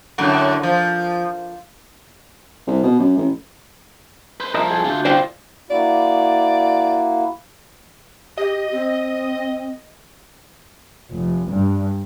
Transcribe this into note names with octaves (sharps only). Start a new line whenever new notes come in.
F#2 A2 D3
F3
C2
B2
F#2
A1
B4 C5
C2 F3 A#4 D#5 E5
G#4 A4
D3 A3 F4 F#4 G6
A2 F4 C5 D5 G5
A#3 E4 F#4 D5
G4 D#5
C4
F1
G2